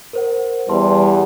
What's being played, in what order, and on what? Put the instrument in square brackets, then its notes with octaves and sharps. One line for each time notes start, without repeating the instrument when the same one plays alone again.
[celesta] A#4 C5 F#5
[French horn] E2 [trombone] G3 [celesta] B4 A5 C6